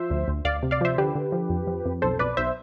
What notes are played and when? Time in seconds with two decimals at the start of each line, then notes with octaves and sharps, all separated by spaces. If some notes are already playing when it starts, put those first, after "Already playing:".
Already playing: F3 C5 E5
0.10 D2
0.28 D2
0.45 D2 D5 F5
0.63 C3
0.71 D5 F5
0.81 F3 C5 E5
0.98 D3 G4 B4
1.15 D3
1.32 F3
1.50 F2
1.67 F3
1.85 F2
2.02 B1 A4 C5
2.19 B1 B4 D5
2.37 B1 C5 E5